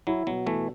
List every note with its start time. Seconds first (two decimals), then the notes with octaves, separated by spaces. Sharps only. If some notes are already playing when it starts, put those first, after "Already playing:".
0.07 F#3 E4
0.27 B2 F#3
0.47 B2 E3 A3